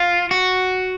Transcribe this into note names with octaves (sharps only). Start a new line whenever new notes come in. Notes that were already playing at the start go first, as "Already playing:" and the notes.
Already playing: F4
F#4